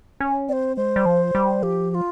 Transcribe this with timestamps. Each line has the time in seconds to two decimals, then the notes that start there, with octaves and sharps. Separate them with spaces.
0.20 C#4
0.49 C4 C5 D5
0.76 G#3 C5
0.96 G3
1.06 F3
1.35 G3
1.63 F3 G4
1.91 G4
1.94 F4